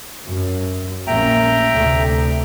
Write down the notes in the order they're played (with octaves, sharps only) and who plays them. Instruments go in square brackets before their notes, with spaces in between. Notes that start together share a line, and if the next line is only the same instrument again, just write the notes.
[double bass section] F#2
[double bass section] A#1 A#3 C#4 [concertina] E5 G5 A#5
[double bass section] A3
D2 C3